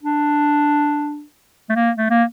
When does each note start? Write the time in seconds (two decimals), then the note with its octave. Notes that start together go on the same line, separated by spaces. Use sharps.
0.03 D4
1.69 A3
1.76 A#3
1.97 A3
2.10 A#3